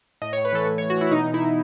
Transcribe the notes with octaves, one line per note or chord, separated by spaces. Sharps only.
A2 D#5
A2 C#5
B4
E3 A4
A2
E3 C#5
F#4
E3 E4
B2 D#4
B2
E4
B2